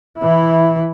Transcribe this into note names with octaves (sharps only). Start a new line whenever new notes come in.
E3 E4